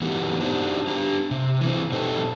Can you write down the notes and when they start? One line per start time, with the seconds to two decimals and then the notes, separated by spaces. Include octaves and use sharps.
0.01 E3 B3 D#4 F#4 G4 A#4
0.40 D4 D#4 F#4 G4 C5
0.87 D4 G4 A#5
1.31 C3
1.61 E3 C4
1.92 B2 C4 D#4 G4 A4